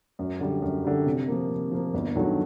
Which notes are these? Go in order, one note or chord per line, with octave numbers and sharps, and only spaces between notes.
F#2
D3 G3
F#2
D3 G3
C3
F3 A#3
C3
F3 A#3
G1
G2 D#3 F#3 A3